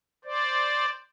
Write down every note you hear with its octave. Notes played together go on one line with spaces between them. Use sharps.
C5 D5